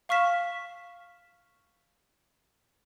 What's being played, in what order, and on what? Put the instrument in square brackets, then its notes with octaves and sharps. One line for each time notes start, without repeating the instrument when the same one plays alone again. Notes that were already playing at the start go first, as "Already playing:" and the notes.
[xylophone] F5 C#6 F6 B6 E7